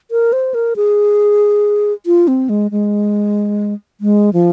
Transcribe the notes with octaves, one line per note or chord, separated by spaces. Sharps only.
A#4
C5
A#4
G#4
F4
C4
G#3
G#3
G#3
F3